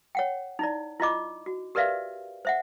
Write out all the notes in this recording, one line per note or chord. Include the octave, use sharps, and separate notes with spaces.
C#5 F#5 G5
D#4 E4 D5
E4 F4 D#5 D6
F#4
G4 A#4 B4 D5 E5 F5
C5 E5 F#5